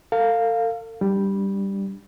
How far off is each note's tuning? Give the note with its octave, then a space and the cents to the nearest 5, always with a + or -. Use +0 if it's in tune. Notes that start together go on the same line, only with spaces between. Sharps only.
A4 +40 F5 +0
G3 +0 D4 +0